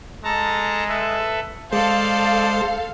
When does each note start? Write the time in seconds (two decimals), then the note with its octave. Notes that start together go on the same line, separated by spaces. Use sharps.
0.24 G#3 A4 A5 A#5
0.88 A4 B4 E5
1.73 G#3 G#4 A4 C5 D5 F5